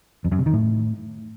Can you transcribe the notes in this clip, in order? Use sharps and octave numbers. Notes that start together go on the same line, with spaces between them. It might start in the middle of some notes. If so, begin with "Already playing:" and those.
F2
F#2
C3
D#3
A2